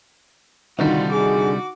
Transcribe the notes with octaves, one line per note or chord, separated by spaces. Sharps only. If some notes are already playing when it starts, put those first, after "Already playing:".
C2 D3 D#3 G3 D#4 F4 F#4
F#4 G#4 D6